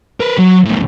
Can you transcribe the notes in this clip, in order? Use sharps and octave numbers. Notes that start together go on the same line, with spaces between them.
A#4 B4
F#3
C#2 A2